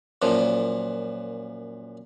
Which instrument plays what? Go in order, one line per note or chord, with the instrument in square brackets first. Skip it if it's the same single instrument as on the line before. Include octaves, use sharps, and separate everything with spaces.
[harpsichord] F#2 A#2 F3